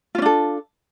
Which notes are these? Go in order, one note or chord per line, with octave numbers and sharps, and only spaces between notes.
C#4 D4 F4 A4